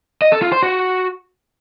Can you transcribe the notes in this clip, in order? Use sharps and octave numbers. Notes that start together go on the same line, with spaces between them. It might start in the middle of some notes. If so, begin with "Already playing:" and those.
D#5
A4
F4
C5
F#4